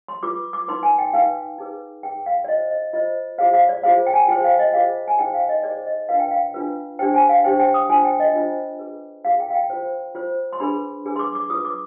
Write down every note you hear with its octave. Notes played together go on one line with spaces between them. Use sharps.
C6
F4 B4 D6
D6
D#4 B4 C6
G#5
G5
D#4 B4 F5
D#4 G#4 B4
D#4 G#4 B4 G5
F5
D5
F4 C5 D#5
D#5
F4 C5 D#5
F4 G#4 C5 F5
F5
D5
F4 G#4 C5 F5
G5
G#5
F4 G#4 C5 G5
F5
D#5
F4 G#4 C5 F5
G#5
D#4 G#4 C5 G5
F5
D#5
D#4 G#4 C5 D5
D#5
D4 F4 B4 F5
G5
F5
D4 F4 B4
D4 G4 C5 G5
G#5
F5
D4 G4 C5 G5
G5
D#6
D4 F4 C5 G#5
G5
D#5
D4 F4 C5
F4 G#4 B4
F4 G#4 B4 F5
G5
F5
G5
F4 C5
F4 C5
C6
D4 G#4 B4 B5
D4 G#4 B4
C6
D6
D6
F4 B4 D#6
D6